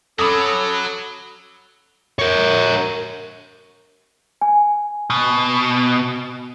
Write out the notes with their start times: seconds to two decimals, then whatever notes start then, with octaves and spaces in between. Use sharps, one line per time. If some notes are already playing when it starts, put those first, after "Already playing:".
0.19 F#3 C#4 A4 B5 D6 D#6
2.19 A#4 C#5
4.41 G#5
5.10 B2